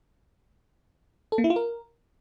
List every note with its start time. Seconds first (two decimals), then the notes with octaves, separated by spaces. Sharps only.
1.32 A4
1.38 A#3
1.44 E4
1.50 F4
1.56 A#4